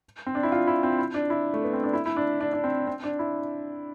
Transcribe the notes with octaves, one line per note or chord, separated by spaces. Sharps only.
C4
D4
E4
F4
E4
C4
E4
D4
E4
A3
B3
C4
D4
E4
E4
D4
D4
D4
C4
C4
D4
E4